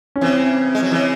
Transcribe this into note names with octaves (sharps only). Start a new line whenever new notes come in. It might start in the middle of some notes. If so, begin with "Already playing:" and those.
C#4
C#3 E3 C4
G#3
F#3
C#3 E3